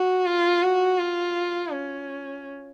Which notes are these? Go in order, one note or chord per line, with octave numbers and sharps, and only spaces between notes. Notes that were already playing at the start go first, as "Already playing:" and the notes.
Already playing: F#4
F4
F#4
F4
C#4